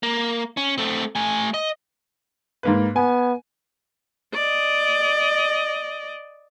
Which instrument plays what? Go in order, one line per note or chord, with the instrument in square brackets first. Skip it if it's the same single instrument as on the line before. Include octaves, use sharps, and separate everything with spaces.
[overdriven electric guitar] A#3
C#4
A3 C4
A3 G#5
D#5
[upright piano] G#2 A#3 B4
[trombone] B3 [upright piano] G#5
[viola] D5 D#5